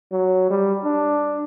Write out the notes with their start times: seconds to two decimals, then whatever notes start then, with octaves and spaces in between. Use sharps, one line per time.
0.12 F#3
0.50 G3
0.84 D4